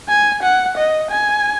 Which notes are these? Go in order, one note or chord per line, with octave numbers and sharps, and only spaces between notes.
G#5
F#5
D#5
G#5